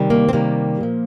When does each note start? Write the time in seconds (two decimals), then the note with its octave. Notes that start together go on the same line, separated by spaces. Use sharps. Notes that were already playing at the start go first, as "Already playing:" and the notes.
Already playing: C3 D#3 G3
0.10 A#3
0.29 C4
0.33 C3 D#3 G3 A#3
0.81 A#2 F3